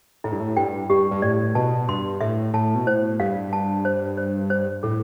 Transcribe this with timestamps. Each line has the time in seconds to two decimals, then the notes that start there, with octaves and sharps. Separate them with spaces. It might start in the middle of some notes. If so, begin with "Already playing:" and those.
0.24 A2 E4
0.32 G2
0.40 A2
0.57 G2 G5
0.90 G2 G4
1.11 G2
1.22 A2 D5
1.55 B2 A5
1.88 G2 C6
2.21 A2 E5
2.54 A2 A5
2.75 B2
2.87 A2 C5
3.20 G2 F5
3.53 A5
3.85 C5
4.17 C5
4.50 C5
4.83 A2 A4